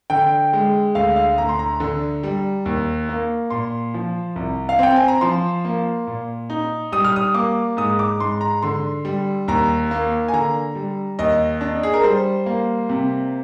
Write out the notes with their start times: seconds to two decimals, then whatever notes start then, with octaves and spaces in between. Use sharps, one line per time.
0.10 D3 G5
0.53 G#3
0.95 D2 F5
1.16 F5
1.38 D2 A#5
1.49 C6
1.59 A#5
1.80 D3
2.23 G3
2.66 D#2
3.09 A#3
3.50 A#2 C6
3.94 F3
4.36 C2
4.69 F5
4.79 C4 G5
4.96 G#5
5.08 A#5
5.21 F3 C6
5.65 A#3
6.07 A#2
6.50 D#4
6.92 G3 D#6
7.04 F6
7.16 D#6
7.34 A#3 D6
7.77 G#2 D#6
7.99 D6
8.20 G#2 C6
8.41 A#5
8.63 D3 C6
9.05 G3
9.48 D#2 A#5
9.91 A#3
10.28 G#5
10.33 D3 A#5
10.75 G3
11.19 D#2 D#5
11.61 D4
11.83 G#4
11.94 A#4
12.03 G3 C5
12.46 A#3
12.89 C3